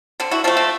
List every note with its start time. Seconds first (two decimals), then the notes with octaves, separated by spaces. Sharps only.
0.20 D3 C4
0.31 E4 F#4
0.44 F3 A3 C4
0.57 C4